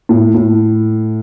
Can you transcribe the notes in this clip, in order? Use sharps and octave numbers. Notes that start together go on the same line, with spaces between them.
A2
A2